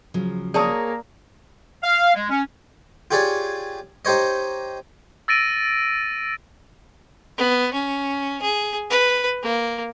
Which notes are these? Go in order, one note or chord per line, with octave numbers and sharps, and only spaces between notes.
C#3 F3 F#3
A#3 G#4 A#4 C#5 D5 A5 D#6
F5
G#3
C#4
F4 G4 G#4 C#5 D5
D#4 G4 C5 C#5 D#5
E6 A6 A#6 D7 D#7
B3
C#4
G#4
B4
A#3